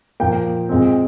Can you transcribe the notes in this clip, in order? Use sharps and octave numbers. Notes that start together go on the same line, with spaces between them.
A#2 F3 A#3 G5
A#2 G#3 C4